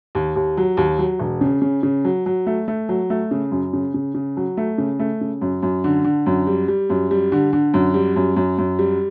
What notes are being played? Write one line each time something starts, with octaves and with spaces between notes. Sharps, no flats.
D#2
D#2
F#3
D#2
F#3
E1
C#3
C#3
C#3
F#3
F#3
A3
A3
F#3
A3
C#3
F#2
C#3
C#3
C#3
F#3
A3
C#3
A3
C#3
F#2
F#2
D3
D3
F#2
G3
G3
F#2
G3
D3
D3
F#2
G3
F#2
F#2
F#2
G3